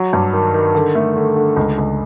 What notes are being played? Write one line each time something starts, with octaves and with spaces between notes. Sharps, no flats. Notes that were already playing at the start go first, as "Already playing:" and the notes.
Already playing: F#3
G2
D#3
D#3
D3
A3
D3
D3
C#2
C#2